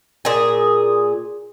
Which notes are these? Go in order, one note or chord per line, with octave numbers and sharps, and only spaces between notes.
A#2 G#4